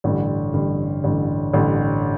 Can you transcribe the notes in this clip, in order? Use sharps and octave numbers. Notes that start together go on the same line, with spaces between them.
A1 G2 D3
A1 G2 D3
A1 G2 D3
A1 G2 D3